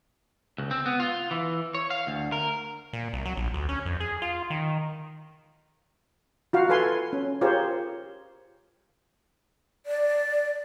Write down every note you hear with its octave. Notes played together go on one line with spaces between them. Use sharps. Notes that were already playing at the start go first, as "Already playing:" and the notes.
C#2
C4
B3
F4
E3
C#5
F5
D2
A#4
A#2
C2
F#3
A#1
D2
C#4
F2
G#4
F4
D#3
F4 F#4 F5
A4 B4 F5 G#5 C6
C#4
F4 G4 G#4 A#4 C5 C#5
D5